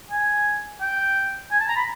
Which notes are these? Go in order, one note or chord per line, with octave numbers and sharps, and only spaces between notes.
G#5
G5
G#5
A5
A#5
B5